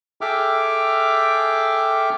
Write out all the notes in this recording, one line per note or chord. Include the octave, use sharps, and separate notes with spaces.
G#4 A4 E5 G5 D6 F6